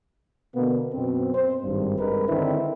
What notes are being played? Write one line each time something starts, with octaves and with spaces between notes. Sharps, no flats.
B2 D3 A#3 B3
F#2 B2 C4
C5
G#1 G2
G2 G#3 A#4 B4
D3 D#3 C4 D4 E4